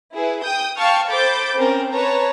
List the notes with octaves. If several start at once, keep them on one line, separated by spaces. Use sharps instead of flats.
E4 G#4 B4
G5 D#6 G6
F5 G5 A5 C#6 F6
A4 C5 B5 D6 G6 A6
C4 C#4 A#4
B4 C#5 A5 A#5